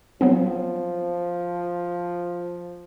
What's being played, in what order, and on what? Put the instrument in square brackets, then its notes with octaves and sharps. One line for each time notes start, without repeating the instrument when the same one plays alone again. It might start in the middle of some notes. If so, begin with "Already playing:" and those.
[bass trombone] F3 [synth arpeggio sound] F#3 B3 C4